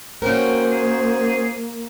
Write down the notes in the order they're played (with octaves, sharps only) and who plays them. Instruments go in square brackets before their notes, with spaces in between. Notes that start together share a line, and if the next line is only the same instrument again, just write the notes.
[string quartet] A#3 [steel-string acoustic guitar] C#4 F#4 A#4 [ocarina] C5 [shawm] G5
[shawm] G#4